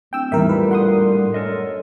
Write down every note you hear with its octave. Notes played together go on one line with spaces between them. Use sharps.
D1 G5 E6
E2 A2 D#3 G3 A#4 E5
A#2 D3 B4
F#5 C6 D#6
F#2 A4 A#4 D#5